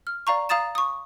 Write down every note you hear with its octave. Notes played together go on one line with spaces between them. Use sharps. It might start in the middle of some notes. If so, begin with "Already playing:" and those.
F6
D5 F5 A#5 C#6
F5 A#5 D#6 A6 E7
C#6 D#6